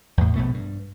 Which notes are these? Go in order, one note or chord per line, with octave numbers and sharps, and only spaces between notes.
E2 A2
A#1 B2 A3
G2